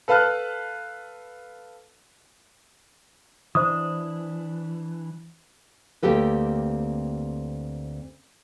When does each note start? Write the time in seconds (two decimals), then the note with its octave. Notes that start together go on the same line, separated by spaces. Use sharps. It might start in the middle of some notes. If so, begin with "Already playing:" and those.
0.08 A4 B4 F5 A5 F6 F#6
3.55 E3 D4 C5 D#6
6.03 D2 A#3 C4 G4 A4 B4